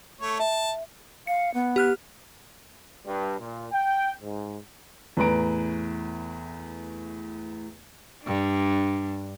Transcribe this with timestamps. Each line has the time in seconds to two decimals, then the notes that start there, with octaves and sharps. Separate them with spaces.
0.21 A3 C#5
0.40 E5 A5
1.27 F5 C#7
1.54 B3
1.76 G4 F6 F#6
3.06 G2
3.39 A#2
3.72 G5
4.22 G#2
5.17 E2 A2 B4 A#5 D7
8.23 G2 D4